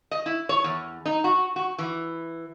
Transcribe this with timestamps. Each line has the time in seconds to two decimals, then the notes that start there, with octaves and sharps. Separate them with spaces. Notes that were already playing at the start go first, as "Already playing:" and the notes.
0.11 D#5
0.26 E4
0.49 C#5
0.64 E2
1.06 D#4
1.24 F#4
1.56 F#4
1.78 E3